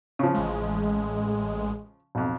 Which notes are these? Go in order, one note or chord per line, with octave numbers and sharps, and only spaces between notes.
C#3 F3
A1 G#3
B1 F2